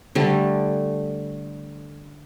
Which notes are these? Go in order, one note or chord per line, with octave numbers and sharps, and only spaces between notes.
D3 G3 A3